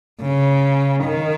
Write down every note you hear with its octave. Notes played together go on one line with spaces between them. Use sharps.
C#3
D#3